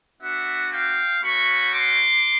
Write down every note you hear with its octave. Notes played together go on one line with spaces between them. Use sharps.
B3 D4 F#4 E5 F#5
F5 G5
A3 C#4 F#4 B5 C#6
C6 D6